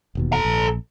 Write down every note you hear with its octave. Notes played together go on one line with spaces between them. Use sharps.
E1 D#2 B2
A4 A#5
A#1